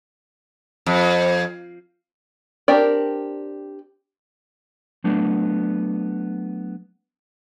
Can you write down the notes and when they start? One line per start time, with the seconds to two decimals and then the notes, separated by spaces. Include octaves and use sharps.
0.86 F2
2.68 C4 D4 G4 A#4 D5
5.04 F#3 A3 B3 D4